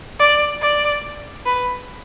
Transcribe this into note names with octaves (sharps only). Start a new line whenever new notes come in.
D5
D5
B4